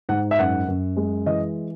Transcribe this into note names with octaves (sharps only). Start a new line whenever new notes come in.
G#2 F#5
E5
F#2 F#5
F#2
G#3
E3 D#5